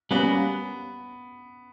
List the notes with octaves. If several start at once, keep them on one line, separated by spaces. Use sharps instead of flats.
G3 A#3 B3 C#4 F#4